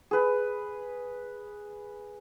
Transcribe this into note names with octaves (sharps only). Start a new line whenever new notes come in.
G#4 B4